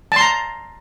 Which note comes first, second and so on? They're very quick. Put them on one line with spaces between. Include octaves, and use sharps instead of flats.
A5 C6 A#5